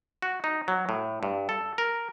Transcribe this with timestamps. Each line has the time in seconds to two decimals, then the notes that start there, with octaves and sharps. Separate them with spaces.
0.22 F#4
0.44 D#4
0.68 F#3
0.89 A2
1.23 G2
1.49 A4
1.78 A#4